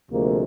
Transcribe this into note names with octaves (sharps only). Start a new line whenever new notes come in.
D2 C3 F3 G#3 A#3